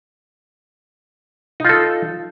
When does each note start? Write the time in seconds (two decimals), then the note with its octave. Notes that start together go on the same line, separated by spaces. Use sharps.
1.60 D#4
1.65 F4
1.69 A4